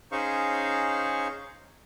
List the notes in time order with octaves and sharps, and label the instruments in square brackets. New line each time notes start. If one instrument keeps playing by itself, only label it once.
[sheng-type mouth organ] C#4 D#4 G#4 C5 F5 C#6